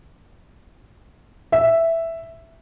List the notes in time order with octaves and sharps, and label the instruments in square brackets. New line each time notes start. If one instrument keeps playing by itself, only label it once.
[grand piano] E5